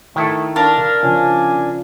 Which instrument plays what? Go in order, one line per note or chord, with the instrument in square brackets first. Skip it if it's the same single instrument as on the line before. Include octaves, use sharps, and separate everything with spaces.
[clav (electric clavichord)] D#3 E4 A4 [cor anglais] A3
[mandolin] D4 A#4 [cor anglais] F5
[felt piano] C#3 F3 [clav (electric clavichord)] C#4 [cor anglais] G#5